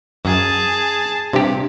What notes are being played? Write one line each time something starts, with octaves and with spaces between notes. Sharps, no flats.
F#2 G#4 A5
G2 C3 G4